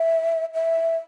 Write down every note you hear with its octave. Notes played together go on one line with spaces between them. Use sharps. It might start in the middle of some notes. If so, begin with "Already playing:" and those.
Already playing: E5
E5